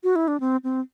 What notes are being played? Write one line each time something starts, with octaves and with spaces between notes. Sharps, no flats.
F#4
E4
D4
C4
C4